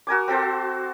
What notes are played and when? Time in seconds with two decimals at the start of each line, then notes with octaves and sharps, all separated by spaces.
0.07 F#4 A#4 G#5 D6
0.28 C4 F#4 A4 C5